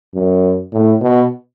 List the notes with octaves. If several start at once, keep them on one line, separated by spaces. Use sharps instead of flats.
F#2
A2
B2